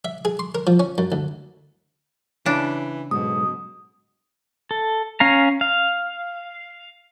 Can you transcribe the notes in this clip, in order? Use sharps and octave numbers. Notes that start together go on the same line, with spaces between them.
E5
G#4
C6
A#4
F3
C#4
F#2
D2
C#3 E3 D4
B1 E2 G#2 B2 D#6
A4
C#4 F5 A#5
F5